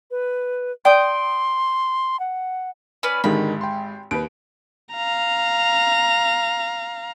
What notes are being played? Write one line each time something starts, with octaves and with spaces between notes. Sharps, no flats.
B4
D5 G5 C6 D#6
F#5
C#4 B4 D5
G#1 G#2 D3 D#3 G#3 G4 B5
G5 C6
D#2 B4 D7
F5 A#5